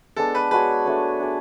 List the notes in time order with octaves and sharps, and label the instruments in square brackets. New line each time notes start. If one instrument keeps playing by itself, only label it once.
[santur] G#3 B3 D4 [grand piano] A4
[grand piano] B4
[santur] G#3 D4 F#4 C#5 [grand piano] B4
[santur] A3 D4 F#4 C#5
D4 G#4 D5